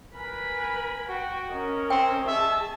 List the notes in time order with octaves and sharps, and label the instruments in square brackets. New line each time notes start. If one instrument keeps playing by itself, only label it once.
[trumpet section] A#4 G#5 [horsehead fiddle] B4 B5
[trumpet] F#4 [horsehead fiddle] G5
[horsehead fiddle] C#4 A#4 [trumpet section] C#5 D#5
[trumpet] C4 [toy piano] G5
[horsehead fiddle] G#4 A5 [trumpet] E5